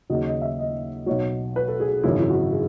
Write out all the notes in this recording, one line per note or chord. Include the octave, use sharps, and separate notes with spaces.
D#2 C#3 F#3 D#5
D#5
E5
D#5
B1 B2 F#3 C#5
B4
A4
G#4
G#1 F#2 C#3 E3 E4
E4
F#4
G#4